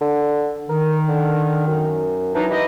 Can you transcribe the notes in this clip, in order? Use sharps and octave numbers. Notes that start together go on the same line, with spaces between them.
D3
D#3 A#4
D3
F#2
E3 F#3 D4 D#4
E4 G4 D#5